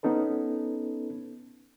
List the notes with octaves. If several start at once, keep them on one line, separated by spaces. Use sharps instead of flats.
B3 C#4 D#4 A4 B4